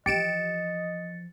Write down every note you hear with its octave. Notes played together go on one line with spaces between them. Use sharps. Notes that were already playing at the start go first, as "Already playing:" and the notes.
E3 F3 G4 D#5 A6 C#7 D7 E7